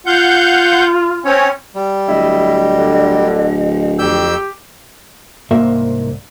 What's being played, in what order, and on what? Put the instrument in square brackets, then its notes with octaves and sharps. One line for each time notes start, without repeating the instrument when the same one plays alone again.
[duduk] F4 [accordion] F5 F#5 G6
[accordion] C4 C#4 C#5
[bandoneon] G3
[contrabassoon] D1 [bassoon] E4 [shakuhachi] D#5
[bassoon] D3
[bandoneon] F2 E6 G6 [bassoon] G4
[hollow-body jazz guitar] C2 G#2 A#3 E5